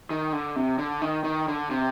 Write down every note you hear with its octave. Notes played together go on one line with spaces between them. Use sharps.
D#3
D3
C3
D3
D#3
D#3
D3
C3